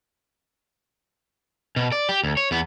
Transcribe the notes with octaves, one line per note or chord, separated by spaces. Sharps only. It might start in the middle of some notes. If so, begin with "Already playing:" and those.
B2
D5
G4
D2
C#5
E2 B3